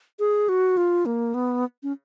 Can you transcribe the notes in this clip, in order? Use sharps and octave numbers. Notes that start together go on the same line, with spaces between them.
G#4
F#4
F4
A#3
B3
C#4